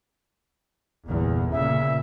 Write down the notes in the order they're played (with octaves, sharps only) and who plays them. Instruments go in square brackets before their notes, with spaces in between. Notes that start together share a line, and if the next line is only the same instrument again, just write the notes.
[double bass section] G1 E2 A#2
[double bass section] A#2 C#3 [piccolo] E5